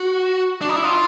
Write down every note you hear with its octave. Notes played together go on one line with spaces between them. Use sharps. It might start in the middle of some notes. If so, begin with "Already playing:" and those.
Already playing: F#4
D4
D#4
E4
F4